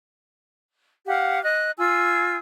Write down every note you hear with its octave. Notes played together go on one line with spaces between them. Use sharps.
G4 F5 F#5
D#5 F#6
F4 G#5 E6